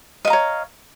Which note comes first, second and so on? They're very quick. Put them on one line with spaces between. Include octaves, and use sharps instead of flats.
D#5 F5 A#5 C#5